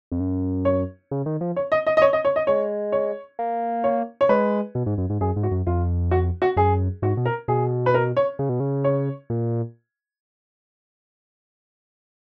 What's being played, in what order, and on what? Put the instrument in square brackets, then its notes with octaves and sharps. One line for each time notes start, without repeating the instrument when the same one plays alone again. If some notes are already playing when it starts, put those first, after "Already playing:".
[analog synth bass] F2
F#2
[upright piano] C#5
[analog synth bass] C#3
D#3
F3
[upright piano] C#5
D#5
D#5
D#5
C#5
D#5
C#5
D#5
[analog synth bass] G#3 [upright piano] C#5
[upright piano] C#5
[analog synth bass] A#3
[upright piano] C#5
C#5
[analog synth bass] G#3 [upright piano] B4
[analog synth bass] B2
G#2
F#2
G#2
[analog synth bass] F#2 [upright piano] G#4
[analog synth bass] G#2
[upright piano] F#4
[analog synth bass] F#2
[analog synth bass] F2 [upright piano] F4
[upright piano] F#4
F#4
[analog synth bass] F#2 [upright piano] G#4
[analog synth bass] G#2 [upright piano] F#4
[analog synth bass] B2
[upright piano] A#4
[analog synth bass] B2 [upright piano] G#4
[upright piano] B4
A#4
C#5
[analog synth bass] C#3
B2
C#3
[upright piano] C#5
[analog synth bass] A#2